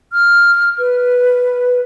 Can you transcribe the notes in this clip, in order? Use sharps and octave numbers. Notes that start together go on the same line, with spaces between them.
F6
B4